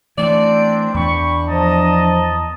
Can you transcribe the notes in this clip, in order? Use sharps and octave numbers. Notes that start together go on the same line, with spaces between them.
E3 A3 C4 D4 D5
E2 D4 G5 B5 C#6
F3 D#5 A5 A#5